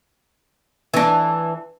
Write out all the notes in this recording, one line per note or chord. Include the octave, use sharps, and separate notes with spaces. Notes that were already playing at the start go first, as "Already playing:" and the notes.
E3 D4